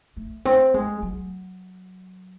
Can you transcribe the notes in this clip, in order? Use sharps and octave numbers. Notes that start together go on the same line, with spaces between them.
A3
C4
G#3
F#3